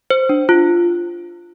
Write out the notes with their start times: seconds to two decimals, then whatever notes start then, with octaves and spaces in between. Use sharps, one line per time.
0.10 C5
0.29 D4
0.49 F4